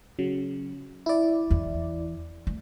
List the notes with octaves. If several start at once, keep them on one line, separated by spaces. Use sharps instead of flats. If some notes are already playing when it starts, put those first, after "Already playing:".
C#3 F#3
E4 D5
E2
A3